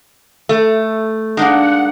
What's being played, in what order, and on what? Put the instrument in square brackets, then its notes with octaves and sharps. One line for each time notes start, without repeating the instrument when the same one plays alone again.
[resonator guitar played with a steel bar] A3
[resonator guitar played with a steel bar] G#3 [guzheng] A#3 D4 D#4 [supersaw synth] F#5